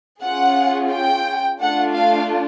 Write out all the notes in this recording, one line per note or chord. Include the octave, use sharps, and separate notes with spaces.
C#4 F4 G#4 F#5
G5
A3 D4 F4 F#5
F5